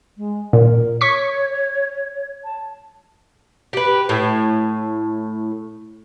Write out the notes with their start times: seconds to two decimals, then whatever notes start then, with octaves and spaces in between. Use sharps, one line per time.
0.17 G#3
0.53 A#2 A#4
1.01 C#5 C#6 B6
2.44 A5
3.73 G4 B4
4.09 A2